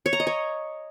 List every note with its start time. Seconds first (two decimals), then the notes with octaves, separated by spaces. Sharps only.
0.06 C#5
0.13 A#5
0.20 D#5
0.27 C#5